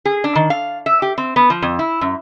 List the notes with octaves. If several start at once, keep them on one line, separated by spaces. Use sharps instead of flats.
G#4
D4
D#3
F5
E5
G4
C4
B3
F3
F2
E4
F#2